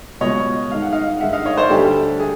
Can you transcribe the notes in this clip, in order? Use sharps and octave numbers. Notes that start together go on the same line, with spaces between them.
C#2 B2 G3 C#5 D#5
G#2 D#3 G#3 F5
F#5
D#5 F5
G2 D#3 G#3 E5 F#5
D#5 F5
C#5 D#5
C5 D5
D2 D3 G3 G4 A4
G#4